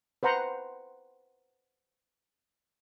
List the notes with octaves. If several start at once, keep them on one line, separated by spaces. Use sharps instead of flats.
B4 C5 F#5 A#5 C6